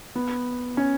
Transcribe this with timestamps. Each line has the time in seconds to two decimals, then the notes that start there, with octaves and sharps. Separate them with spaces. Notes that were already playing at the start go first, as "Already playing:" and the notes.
0.15 B3
0.77 C#4